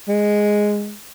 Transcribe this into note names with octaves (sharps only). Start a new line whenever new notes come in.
G#3